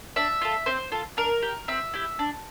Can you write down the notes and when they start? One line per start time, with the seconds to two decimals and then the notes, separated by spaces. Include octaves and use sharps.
0.16 D4 E5
0.41 F4 A4
0.66 C4 C5
0.92 F4 A4
1.17 D4 A#4
1.42 G4
1.68 C4 E5
1.94 E4 G4
2.19 D4